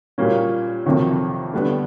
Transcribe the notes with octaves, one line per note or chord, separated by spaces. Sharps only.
A#2 G3 A#3 C#4
F2 C3 D#3 F#3
D3 G3 B3 D4